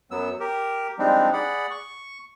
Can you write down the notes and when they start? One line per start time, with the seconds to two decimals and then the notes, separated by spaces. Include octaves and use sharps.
0.11 F#2 F#3 B3 E6
0.40 G4 A#4
0.99 F3 G3 G#3 C4 D4 D#4
1.33 G#4 D5 F#5 B5
1.71 C#6